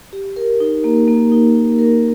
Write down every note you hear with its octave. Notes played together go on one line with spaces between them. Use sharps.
G4
A#4
D#4
A#3
A#3
D#4
D#4
A#4